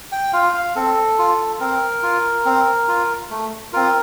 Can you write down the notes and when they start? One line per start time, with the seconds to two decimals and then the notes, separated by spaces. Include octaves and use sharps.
0.12 G5
0.33 F4 F5
0.54 F5
0.76 C4 A4
1.19 F4
1.60 C4 A#4
2.03 F4
2.45 C4
2.88 F4
3.31 A3
3.73 C4 F4 A#4